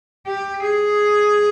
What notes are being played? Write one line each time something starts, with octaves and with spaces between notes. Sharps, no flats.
G4
G#4